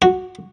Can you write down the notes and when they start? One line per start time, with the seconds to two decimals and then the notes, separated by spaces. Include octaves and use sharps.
0.02 F#4